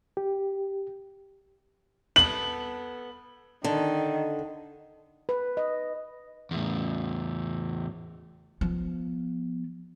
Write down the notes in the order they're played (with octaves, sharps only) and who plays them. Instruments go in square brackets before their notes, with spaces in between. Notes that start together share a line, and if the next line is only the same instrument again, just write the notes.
[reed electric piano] G4
[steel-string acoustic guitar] B3 A4 [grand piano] F#7
[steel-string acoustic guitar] D3 [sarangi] D#3
[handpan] B4
D#5
[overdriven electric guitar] E2 A2
[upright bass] F3 B3